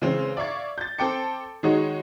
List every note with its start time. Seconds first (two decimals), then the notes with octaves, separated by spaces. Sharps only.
0.02 C#3 E3 G#3 C4 C#4
0.37 D5 E5 F5 C#6 G#6
0.78 G6 A6
0.98 C4 A4 G5 D6 C#7
1.63 D#3 G#3 D#4 F#4 C#5